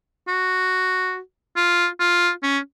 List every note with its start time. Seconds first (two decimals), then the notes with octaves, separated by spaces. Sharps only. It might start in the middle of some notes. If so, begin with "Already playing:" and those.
0.28 F#4
1.57 F4
2.00 F4
2.43 C#4